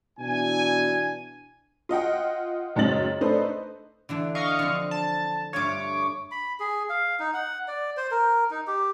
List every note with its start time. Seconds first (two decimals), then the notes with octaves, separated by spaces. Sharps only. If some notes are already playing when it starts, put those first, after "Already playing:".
0.19 B2 E3 D4 G#5
1.89 F4 D#5 F#5 G5
2.76 C#2 F#2 C4 D#4 A6 F#7
3.21 A3 D4 D#4 A4 B4 C5
4.09 D3 E3 D4
4.35 D#5 F5 C#6
4.59 D3 F3 C4
4.91 A5
5.53 G2 A3 F4 C#5 D6
6.31 B5
6.60 G#4
6.89 F5
7.20 D#4
7.34 F#5
7.68 D5
7.97 C5
8.11 A#4
8.51 D#4
8.67 G4